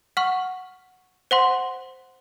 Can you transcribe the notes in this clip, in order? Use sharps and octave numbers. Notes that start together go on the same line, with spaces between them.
F#5 C#6 F6
C5 F#5 C6